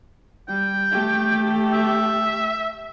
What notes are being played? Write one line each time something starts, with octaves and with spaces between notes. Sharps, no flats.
G3 G5
A3 G4
E5